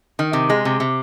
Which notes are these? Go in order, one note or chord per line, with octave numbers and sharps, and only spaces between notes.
D#3
C3
G#3
C3
C3